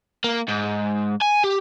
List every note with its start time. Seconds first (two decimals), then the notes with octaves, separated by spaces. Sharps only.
0.24 A#3
0.49 G#2
1.22 G#5
1.44 G4